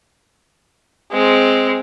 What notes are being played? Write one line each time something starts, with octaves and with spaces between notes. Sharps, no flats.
G#3 C4